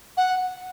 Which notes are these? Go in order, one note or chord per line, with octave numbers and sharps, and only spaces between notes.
F#5